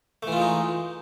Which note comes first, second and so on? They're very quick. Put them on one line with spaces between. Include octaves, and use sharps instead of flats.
A3 E3 F4 G#3 D#4